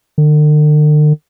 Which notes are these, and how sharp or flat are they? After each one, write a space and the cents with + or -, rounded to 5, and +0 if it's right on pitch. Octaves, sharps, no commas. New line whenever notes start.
D3 +45